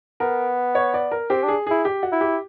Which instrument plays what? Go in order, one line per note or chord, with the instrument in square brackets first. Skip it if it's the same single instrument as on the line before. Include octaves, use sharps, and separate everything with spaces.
[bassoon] B3 [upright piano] A#4
[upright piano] C#5
D5
A#4
[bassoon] C4 [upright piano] G4
[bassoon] D4 [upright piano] G#4
[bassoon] E4 [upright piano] G#4
[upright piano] G4
F#4
[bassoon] E4
[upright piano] G4